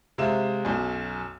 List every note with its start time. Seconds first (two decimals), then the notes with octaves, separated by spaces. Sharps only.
0.18 C3 G#3 E5 F5 E7
0.65 B1 F#2